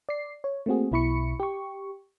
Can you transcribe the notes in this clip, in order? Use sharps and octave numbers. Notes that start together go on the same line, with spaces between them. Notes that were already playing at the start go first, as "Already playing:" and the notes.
D5 C7
C#5
A3 A#3 C4 F#4 G#4
B1 B2 E4 B5 C#6 C#7
G4 C#6